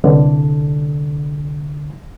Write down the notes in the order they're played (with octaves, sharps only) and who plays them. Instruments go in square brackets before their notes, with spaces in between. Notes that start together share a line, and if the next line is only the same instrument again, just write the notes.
[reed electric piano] C2 D3